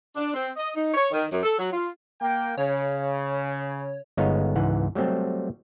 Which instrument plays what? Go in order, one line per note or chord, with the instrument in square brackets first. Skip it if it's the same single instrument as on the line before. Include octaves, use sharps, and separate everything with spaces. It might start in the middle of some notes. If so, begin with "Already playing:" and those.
[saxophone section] D4
C4
D#5
D#4
C#5
D#3
F#2
A4
F#3
F4
[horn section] A#3 G5
[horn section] C#3 [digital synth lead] C#5
[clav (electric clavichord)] G1 G#3 B3 D#4 C#5 F5
C#2 G#2 E3 F#5
F#3 G3 A3 C4